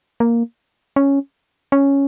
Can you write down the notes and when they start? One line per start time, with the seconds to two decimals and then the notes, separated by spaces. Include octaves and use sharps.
0.20 A#3
0.96 C#4
1.72 C#4